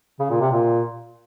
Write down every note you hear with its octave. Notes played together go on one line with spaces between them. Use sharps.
C#3
A#2
C3
A#2